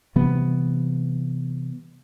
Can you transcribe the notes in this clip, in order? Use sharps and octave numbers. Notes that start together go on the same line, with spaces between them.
C3 E3 G3 B3